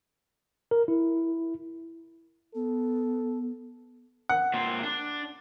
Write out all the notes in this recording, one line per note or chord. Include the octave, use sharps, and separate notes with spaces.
A#4
E4
B3 A4
F#5
A#2 C4
D4